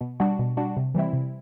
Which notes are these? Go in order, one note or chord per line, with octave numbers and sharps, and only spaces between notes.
B2
G3 D4 F#4
B2
G3 D4 F#4
C3
E3 G3 C4 E4
C3